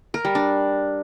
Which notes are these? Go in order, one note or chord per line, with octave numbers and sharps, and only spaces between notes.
A#4
G3
D4